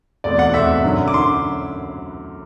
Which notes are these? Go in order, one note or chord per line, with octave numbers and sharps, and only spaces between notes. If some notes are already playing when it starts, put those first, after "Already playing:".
E2 B2 A3 C4 D5
F#5
E2 B2 A3 C4 E5
F#2 D3 F#3
D6
D3 F#3 C6